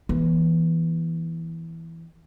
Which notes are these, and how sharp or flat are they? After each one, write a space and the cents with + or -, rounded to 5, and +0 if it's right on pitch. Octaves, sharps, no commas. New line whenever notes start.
E3 +0 B3 -45